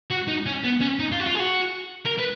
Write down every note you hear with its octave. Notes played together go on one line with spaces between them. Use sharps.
F#4
D#4
C#4
B3
C#4
D#4
F4
F#4
F4
G#4
F#4
A#4
B4